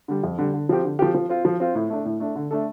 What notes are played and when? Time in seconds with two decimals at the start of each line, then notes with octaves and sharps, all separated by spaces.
0.08 D3 G3
0.24 F2
0.38 D3 G3
0.53 D3
0.69 F3 C4 G4
0.84 D3
0.99 F3 C4 G4
1.14 F3
1.29 C4 F4
1.45 F3
1.60 C4 F4
1.75 A2
1.90 A3 D4
2.05 A2
2.20 A3 D4
2.35 D3
2.51 A3 D4 A4